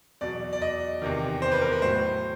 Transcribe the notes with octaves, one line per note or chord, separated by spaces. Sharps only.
E2 B2 F#3 D5
D5
D#5
E2 C3 D#3
C5
B4
A#4
B4
A2 F#3 C5